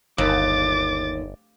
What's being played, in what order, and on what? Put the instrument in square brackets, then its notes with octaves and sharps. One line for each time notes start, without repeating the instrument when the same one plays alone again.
[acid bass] G1 [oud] D#2 [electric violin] D6 A6